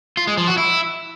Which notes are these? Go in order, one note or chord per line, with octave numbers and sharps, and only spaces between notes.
F4
G#3
F3
F#4
E4